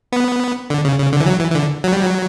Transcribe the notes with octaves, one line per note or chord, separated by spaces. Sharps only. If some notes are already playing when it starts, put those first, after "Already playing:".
B3
D3
C#3
C#3
D3
E3
F#3
E3
E3
D3
F#3
G3
F#3